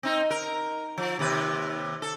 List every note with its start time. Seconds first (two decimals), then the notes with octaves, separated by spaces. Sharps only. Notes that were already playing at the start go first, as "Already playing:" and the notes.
0.03 C4 D#4
0.30 A#4
0.98 F3
1.19 D#2 C3 B4
2.02 A4